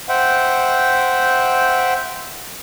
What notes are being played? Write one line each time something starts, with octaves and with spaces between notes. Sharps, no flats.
C5 E5 F#5 G5